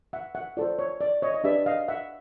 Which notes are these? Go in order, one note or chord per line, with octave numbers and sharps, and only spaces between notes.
E5 F#5
E5 F#5
F4 A4 C5 D5
C#5
D5
C#5 D#5
D#5
D4 G4 B4 D5 E5
D#5 F5
E5 F#5